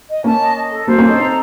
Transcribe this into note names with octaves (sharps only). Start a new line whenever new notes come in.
D#5
A#3 C#4 A5
D#5
D#5
A4
F#3 A#3 C5
A#3 C#4
A4
C4 D#4
C4 D#4 A#5